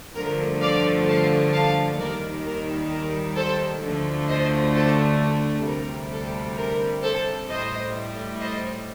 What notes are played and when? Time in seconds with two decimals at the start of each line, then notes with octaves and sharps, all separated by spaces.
0.16 G2 D3 F3 A3 A#4
0.62 D5 F5
1.08 F5 A5
1.53 F5 A5
1.99 D#2 D#3 G3 A#4 D5
2.45 A#4
2.90 A#4
3.36 A4 C5
3.82 D2 D3 F3 A3
4.28 C5 D#5
4.74 A4 C5
5.19 A4
5.65 D2 C3 G3 A#4
6.12 A4
6.57 A#4
7.03 A4 C5
7.49 A2 G3 C5 D#5
8.40 C5 D#5